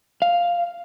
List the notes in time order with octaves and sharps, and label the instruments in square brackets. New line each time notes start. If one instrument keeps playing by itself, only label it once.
[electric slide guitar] F5